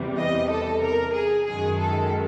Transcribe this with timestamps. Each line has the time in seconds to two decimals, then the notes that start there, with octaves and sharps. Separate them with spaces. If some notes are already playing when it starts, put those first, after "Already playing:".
Already playing: E2 C3 E3 G3
0.18 D#5
0.49 A4
0.82 A#4
1.14 G#4
1.46 F#2 D#3 G#3 G#4
1.79 A4